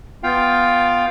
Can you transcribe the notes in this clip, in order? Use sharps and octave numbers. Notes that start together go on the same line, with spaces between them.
B3 F4 F5 G5